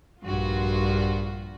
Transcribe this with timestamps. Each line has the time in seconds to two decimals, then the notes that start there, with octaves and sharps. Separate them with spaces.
0.23 A#1 G2 F4 F#4